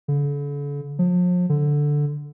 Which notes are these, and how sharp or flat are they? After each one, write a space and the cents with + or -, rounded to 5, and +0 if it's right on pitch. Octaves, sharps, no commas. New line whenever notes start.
D3 -40
F3 +40
D3 +0